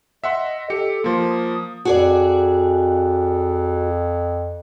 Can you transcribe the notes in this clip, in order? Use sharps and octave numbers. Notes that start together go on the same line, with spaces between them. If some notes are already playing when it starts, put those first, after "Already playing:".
D#5 E5 F#5 C6
G4 A4 C#7
F3 A#3 C6
D#6
F2 F#4 G#4 D5